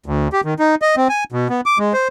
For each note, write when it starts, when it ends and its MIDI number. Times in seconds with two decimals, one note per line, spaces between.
0.06 0.28 38
0.33 0.41 67
0.45 0.54 51
0.59 0.75 63
0.82 0.95 75
0.96 1.08 60
1.09 1.24 80
1.32 1.48 47
1.49 1.61 59
1.66 1.78 86
1.79 1.93 56
1.94 2.08 72